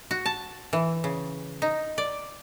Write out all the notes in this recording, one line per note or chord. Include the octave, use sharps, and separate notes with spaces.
F#4
A5
E3
C#3
D#4
D5